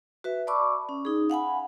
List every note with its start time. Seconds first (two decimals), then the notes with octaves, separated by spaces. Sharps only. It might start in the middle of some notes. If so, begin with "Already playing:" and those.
0.24 F#4 B4 E5
0.47 D5 A5 B5 C#6 D6 E6
0.89 C#4
1.05 D#4 G#4
1.30 F5 F#5 G#5 B5